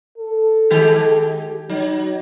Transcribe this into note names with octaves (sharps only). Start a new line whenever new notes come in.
A4
D#3 G#3 G4
F#3 D#4